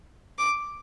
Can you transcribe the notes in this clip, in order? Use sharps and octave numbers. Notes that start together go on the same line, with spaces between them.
D6